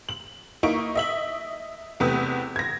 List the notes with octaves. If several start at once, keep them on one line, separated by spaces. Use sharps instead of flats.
F#7
A#3 D#4 E4 C#6 D7
D#5 E5 F#7
E2 C3 A3 B4 D#6
G#6 A#6